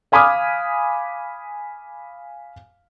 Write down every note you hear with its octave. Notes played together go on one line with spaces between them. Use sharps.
F5 G#5 B5 D6 D#6 F6